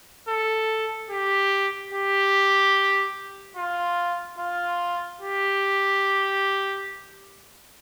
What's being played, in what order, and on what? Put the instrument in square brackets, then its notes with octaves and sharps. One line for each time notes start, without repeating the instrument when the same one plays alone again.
[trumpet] A4
G4
G4
F4
F4
G4